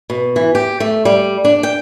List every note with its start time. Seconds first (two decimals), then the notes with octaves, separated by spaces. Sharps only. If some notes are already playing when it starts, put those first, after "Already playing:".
0.10 B2
0.36 E3
0.55 G4
0.80 A3
1.05 G3
1.45 D4
1.63 G5